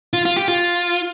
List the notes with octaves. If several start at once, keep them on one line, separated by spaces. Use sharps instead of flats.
F4
F4
G4
F4